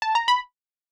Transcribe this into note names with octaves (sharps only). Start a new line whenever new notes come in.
A5
A#5
B5